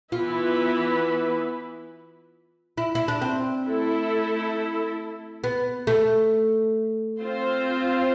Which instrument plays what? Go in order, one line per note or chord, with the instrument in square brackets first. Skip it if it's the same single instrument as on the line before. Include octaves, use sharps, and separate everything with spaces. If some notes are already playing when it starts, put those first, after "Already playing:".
[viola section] E3 B3 E4 B4 [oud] F4
[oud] E4
E4
D4
C4
[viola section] A3 E4 A4
[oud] B3
A3
[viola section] C4 F4 C5